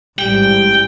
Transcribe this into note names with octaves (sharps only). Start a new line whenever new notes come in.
A1 G#2 G3 G5